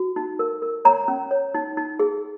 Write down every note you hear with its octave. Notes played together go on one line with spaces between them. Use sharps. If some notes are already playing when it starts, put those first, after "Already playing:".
Already playing: F#4
D#4
A#4
A#4
C#5 A#5
C#4
C#5
D#4
D#4
G#4